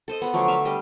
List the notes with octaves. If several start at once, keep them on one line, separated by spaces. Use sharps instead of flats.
A4 C5 D#5
B3 F#5 B5
D3 F3 F#3 A3
E5 F5
G3 D4 D#5